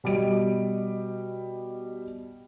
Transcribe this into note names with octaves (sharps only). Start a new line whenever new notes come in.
B2 G3 D#5 D7